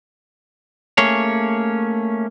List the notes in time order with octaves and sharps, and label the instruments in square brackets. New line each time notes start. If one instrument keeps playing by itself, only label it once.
[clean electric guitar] A3 A#3 C#4 G#4 C#5